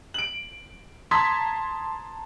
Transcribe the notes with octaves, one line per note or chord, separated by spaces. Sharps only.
D7 F#7
A5 A#5 C6 D#6 G#6 B6